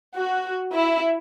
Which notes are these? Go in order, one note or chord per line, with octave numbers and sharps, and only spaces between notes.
F#4
E4